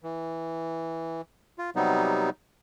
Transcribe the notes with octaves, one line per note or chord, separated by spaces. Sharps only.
E3
F4
C3 F#3 G3 B3 D#4